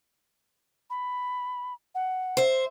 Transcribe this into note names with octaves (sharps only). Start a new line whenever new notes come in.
B5
F#5
C5 E5